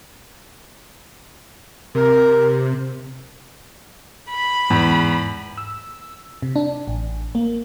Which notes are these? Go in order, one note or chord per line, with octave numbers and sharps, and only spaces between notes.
C3 A#4
B5
E2 G#2
E6
C3
D4
A1
A#3